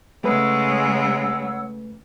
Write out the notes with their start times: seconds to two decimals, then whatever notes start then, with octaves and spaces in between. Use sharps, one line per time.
0.24 C#3 G#3 A3 B4 C#5 F#5 E6